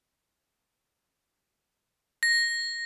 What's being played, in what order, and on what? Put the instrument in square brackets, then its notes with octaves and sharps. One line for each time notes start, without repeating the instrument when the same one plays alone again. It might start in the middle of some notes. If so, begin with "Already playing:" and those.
[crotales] A#6